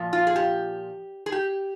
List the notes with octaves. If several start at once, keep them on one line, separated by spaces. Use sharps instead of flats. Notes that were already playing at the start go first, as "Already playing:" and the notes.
Already playing: A#2 F3
F4
G#4
G4
G#4
G4